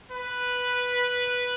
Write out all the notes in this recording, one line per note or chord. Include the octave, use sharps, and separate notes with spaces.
B4